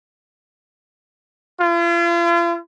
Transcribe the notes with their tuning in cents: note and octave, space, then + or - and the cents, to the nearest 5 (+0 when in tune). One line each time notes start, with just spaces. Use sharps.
F4 -40